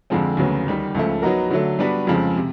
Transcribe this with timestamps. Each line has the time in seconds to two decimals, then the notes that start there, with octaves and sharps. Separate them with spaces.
0.10 F2 D3 F3 G#3 C4
0.37 D2 C#3 F#3 B3
0.67 D#2 D#3 G3
0.95 C#2 C#3 F3 A3
1.22 F#3 B3 D#4 F#4 A#4
1.51 D3 F#3 A3
1.79 G3 B3 D4 F#4 B4
2.07 F2 C#3 F3 G#3
2.37 C3